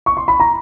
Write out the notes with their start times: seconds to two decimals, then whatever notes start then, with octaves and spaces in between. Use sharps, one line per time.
0.06 C#6
0.17 C6
0.28 B5
0.40 A#5